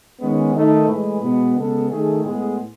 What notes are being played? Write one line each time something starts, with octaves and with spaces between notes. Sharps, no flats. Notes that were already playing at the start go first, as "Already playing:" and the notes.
D#3 G#3 B3 C#4
D#3 A3 D#4
A2 E3 G#3 B4
B2 G#3 B3
C#3 G#3 B3 A4
D#3 A3 G#4
A2 G#3 B3 G#4